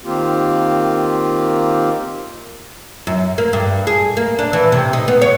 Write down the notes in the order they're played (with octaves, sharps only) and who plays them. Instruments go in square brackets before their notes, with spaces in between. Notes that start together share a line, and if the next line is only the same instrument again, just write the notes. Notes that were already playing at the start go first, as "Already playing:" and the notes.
[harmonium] D#3 A#3 C4 F4 G4
[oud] F#2
A#3
G2
G#4
A#3
D4
E3
C3
D#4
B3
C#5